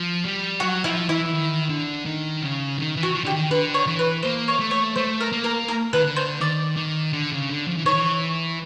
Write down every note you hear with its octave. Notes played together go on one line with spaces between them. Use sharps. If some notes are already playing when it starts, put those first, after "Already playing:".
Already playing: F3
G3
F#3 F#4
F3 E4
E3 E4
E3
D#3
D3
D#3
C#3
D#3
E3
F#4
F3
D3 G4
D#3
D3 B4
C#5
E3
B4
A#3 C5
C#5
A3
C#5
A3 C5
A#4
A#3
A#4
A#4
D#3 B4
D3
C5
D#3 D5
D#3
D3
C#3
D3
F3
E3
D#3 C#5
E3